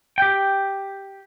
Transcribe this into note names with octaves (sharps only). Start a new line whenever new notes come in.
G4 G5